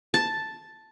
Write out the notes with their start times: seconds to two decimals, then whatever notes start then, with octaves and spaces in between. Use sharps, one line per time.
0.14 A5